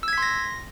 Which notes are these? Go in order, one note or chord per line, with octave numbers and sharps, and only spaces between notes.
C6 E6 G#6 A#6 B6